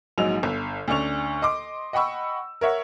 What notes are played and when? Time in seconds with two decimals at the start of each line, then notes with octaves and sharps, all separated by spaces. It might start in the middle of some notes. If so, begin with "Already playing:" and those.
0.18 A#1 G#2 F#3 D#4 E6 F7
0.43 G1
0.88 D2 C#4 D4 C#6 F7
1.42 D#5 C6 D6
1.93 D#5 F#5 G5 B5 C#6 E6
2.61 A#4 C#5 E5 F#5